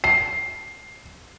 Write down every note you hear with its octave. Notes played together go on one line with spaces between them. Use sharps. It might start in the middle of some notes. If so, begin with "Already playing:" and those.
C7